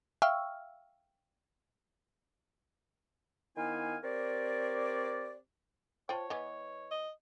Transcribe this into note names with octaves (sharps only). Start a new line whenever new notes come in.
E5 F5 G5 C#6 E6 F6
D#3 B3 E4 C5 F5 G#5
C4 G4 A#4 C#5 D5
F4 C5 C#5 G5 A5
E3 B3 D#5
D#5